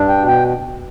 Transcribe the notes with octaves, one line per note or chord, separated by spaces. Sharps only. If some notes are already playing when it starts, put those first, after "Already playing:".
Already playing: G2 D4
G5
B2
G5